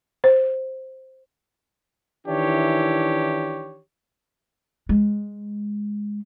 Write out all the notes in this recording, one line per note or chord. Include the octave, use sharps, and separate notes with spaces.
C5
D#3 E3 D4 E4 G4 C#5
G#3